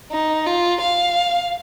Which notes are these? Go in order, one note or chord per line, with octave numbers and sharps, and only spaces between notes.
D#4
F4
F5